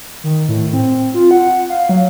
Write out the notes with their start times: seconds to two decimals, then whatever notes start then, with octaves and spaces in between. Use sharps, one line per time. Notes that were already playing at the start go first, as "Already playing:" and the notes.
0.24 D#3
0.49 A2
0.73 C4
1.14 F4
1.31 F#5
1.70 F5
1.89 F#3